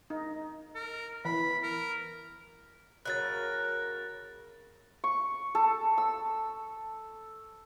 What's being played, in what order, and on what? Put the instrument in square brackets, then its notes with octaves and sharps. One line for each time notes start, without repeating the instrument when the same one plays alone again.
[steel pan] D#4
[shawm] A#4
[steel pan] E3 [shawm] B5
[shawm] A#4
[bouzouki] C#3 F#3 [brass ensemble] A#4 [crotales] F#6 A6
[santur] C#6
A4
E6